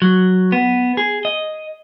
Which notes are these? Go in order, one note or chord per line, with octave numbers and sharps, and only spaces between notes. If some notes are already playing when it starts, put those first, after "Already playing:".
F#3
B3
G#4
D#5